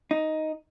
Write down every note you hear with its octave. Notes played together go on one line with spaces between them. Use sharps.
D#4